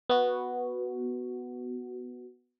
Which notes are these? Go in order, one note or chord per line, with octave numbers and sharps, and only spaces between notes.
B3 F#4